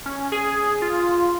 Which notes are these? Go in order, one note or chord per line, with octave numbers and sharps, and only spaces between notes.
C#4
G#4
F4